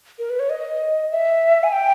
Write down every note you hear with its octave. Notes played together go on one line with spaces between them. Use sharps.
A#4
B4
C#5
D#5
E5
G#5
G5